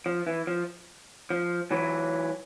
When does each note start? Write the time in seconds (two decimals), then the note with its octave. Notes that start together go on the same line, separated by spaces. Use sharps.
0.06 F3
0.27 E3
0.47 F3
1.30 F3
1.71 E3 F#3